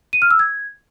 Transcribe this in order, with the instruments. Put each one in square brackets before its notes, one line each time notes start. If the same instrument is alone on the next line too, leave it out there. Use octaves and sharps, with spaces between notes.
[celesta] D#7
F6
E6
G#6